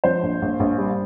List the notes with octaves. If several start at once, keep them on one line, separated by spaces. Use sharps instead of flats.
F3 C5
A#1
A#1
A#1
G3